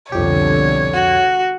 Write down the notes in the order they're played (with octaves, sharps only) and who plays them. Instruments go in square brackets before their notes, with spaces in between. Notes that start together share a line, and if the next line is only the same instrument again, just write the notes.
[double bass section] C2 B2 D3 [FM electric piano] F2 G4 [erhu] C#5
[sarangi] F#4